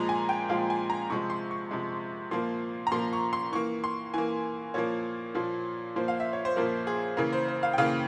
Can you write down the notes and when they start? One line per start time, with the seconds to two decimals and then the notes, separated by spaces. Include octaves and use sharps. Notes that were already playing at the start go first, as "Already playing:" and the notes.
Already playing: A#2 F3 G#3 A#5
0.09 G#5
0.29 G5
0.49 A#2 F3 G#3 F5
0.70 G#5
0.90 A#5
1.10 C3 F3 G#3 C#6
1.30 C6
1.51 C#6
1.71 C3 F3 G#3
2.31 A#2 F3 A#3 C6
2.87 A#5
2.92 A#2 F3 A#3 C6
3.13 C#6
3.33 C6
3.52 E3 A#3 C#6
3.84 C6
4.14 E3 A#3 G#5
4.74 A#2 F3 A#3 C#5
5.35 A#2 F3 A#3
5.96 A#2 F3 A#3 C5
6.08 F5
6.20 E5
6.33 C#5
6.45 C5
6.56 A#2 F3 A#3 A#4
6.87 G#4
7.17 C#3 E3 A#3 A#4
7.33 C5
7.48 C5
7.63 F5
7.74 G5
7.78 C#3 E3 A#3 F5